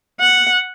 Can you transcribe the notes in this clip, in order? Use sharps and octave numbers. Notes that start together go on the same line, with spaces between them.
F#5